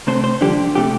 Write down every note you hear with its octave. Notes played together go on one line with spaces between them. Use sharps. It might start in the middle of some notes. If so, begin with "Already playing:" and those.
C3 A3 C4 C5
C5
G2 D3 F3 D4 G4
C3 A3 G4